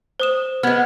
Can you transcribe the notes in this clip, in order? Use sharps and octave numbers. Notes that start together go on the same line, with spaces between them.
C5 D#6 E7
G#3 B3 F6 G#6